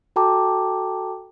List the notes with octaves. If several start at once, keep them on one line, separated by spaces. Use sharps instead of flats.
F#4 A4 G5 A5 A#5 D6